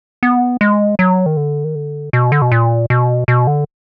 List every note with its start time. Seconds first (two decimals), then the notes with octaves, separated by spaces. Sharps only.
0.23 B3
0.61 G#3
0.99 F#3
1.26 D#3
1.37 D3
1.64 D#3
1.75 D3
2.13 B2
2.32 D3
2.42 B2
2.52 A#2
2.90 B2
3.28 B2
3.47 D3